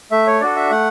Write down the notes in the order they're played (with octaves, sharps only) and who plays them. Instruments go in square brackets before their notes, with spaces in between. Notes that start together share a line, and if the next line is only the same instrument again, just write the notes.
[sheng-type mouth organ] A3 E5
C#5
D4 F#4 A4 D5
E5
A3 F#5